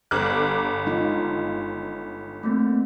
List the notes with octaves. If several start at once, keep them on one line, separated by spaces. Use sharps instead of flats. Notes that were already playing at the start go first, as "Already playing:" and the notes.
G1 D6 F#6
G#3 D#4 F4
A3 A#3 C4